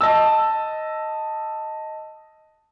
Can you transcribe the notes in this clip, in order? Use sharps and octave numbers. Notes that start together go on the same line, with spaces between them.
D#5 A5 E6